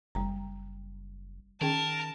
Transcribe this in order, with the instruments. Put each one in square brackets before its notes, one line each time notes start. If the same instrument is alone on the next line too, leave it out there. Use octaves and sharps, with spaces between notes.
[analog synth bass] F#1 [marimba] G3 A#5
[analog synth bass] D#3 [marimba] C#4 G#4 G5 [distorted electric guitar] A#4 [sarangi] A5